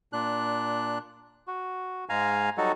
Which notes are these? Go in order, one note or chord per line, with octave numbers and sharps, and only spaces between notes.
A#2 D4 F#6
F#4
G#2 G#3 F5 G#5 A#5
F#3 G3 D#4 F#4 A4